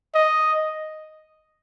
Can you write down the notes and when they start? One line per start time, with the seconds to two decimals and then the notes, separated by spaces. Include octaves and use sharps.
0.15 D#5